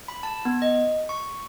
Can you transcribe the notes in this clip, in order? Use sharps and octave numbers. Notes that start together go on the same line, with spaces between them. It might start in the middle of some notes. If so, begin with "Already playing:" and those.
B5
A5
B3
D#5
C#6